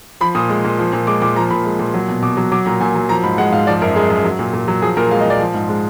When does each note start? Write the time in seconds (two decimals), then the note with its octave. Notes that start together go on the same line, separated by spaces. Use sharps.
0.21 F3 B5
0.35 A#2 D#6
0.50 G#3
0.65 A#2
0.79 F3
0.93 A#2
1.07 G#3 D6
1.22 A#2 D6
1.36 F3 A#5
1.51 A#2 B5
1.65 G#3
1.79 A#2
1.94 F#3
2.08 B2
2.22 B2 D6
2.37 F#3
2.52 F#3 D6
2.66 A#2 A#5
2.81 A#2 G#5
2.95 F#3
3.09 F3 A#5
3.24 G#2 B5
3.38 G#3 F#5
3.52 G#2 F5
3.67 F3 D5
3.81 F#2 A#4
3.95 G#3 G#4
4.10 F#2
4.24 F#3
4.39 A#2
4.54 A#2
4.68 F#3
4.82 F3 G#4
4.97 A#2 A#4
5.11 G#3 F5
5.21 D#5
5.26 A#2 D5
5.40 F3
5.54 G#2
5.69 G#3